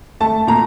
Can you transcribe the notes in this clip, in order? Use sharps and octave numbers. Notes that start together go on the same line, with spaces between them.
A3 A5
A#2 A#5